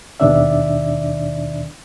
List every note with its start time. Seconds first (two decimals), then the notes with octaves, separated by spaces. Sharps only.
0.20 D#2 B2 D#3 D4 D5 E5